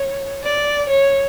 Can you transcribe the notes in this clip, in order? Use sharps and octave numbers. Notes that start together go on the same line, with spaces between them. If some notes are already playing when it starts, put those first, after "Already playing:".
Already playing: C#5
D5
C#5